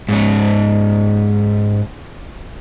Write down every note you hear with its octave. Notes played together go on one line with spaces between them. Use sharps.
G#2 C#4